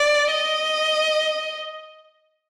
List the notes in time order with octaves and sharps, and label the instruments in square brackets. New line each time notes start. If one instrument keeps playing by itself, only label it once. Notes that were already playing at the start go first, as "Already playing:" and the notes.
Already playing: [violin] D5
D#5